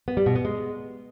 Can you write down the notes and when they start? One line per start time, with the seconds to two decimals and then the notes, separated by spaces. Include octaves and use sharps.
0.08 B3
0.17 G3
0.26 B2
0.35 B3
0.45 G#3